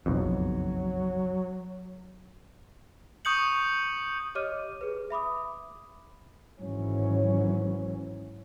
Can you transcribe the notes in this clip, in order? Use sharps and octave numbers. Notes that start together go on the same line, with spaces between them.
F#1 B1 F2 F#3
C#6 D#6 G6 C#7 F#7
G4 C#5 D#5 D6 F6 D#7
G#4 B4
E5 B5 D6 D#6
G#1 G#2 E3 F#3 C#4